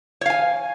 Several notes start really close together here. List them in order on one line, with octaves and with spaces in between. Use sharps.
C#5 F5 G#5